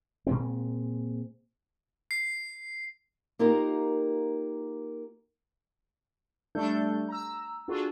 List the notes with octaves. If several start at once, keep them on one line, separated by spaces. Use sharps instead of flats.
A#2 G#3 C4
C7
A#3 D#4 F4 G4 A#4
G3 A3 D4 A4 G6
A#5 E6
D4 F4 F#4 G#4 A4